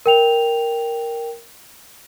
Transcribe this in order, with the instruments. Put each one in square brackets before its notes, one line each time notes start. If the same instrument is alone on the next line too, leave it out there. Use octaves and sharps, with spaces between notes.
[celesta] A#4 G5 F7